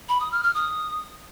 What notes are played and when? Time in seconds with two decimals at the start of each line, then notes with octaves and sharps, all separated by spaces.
0.09 B5
0.20 D#6
0.32 F6
0.43 F6
0.55 D#6